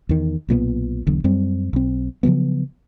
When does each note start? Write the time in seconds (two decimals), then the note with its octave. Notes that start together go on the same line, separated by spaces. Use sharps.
0.09 E2 D#3
0.49 B1 A#2 D3 B3
1.07 E1 B1 D3
1.24 F#2 G3 C4
1.73 B1 C4
2.23 C#3 F3 F#3 B3